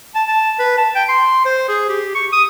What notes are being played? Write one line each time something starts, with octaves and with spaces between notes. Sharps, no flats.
A5
A5
B4
A5
G5
C6
C5
G#4
G4
C#6
D#6